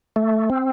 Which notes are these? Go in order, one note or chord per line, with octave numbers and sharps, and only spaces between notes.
A3
C4